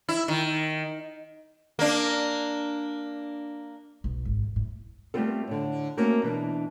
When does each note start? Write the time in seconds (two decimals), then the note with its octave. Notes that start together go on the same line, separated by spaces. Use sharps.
0.09 E4
0.28 D#3
1.79 A#3 D4
4.04 B1
4.25 G#1
4.44 E2
4.56 A2
5.14 G3 A3 B3 C4 F4 A4
5.47 A2 D3
5.97 A3 A#3 C4 C#4 F#4
6.23 B2 E3 D4